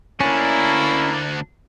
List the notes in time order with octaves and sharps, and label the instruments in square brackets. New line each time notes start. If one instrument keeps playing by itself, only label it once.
[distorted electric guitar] D2 D4 [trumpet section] A#3 E4 [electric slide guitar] C#4